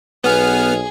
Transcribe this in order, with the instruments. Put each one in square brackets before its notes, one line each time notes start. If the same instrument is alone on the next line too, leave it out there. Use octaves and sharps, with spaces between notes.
[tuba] B1 [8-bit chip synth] B3 F6 [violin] G#4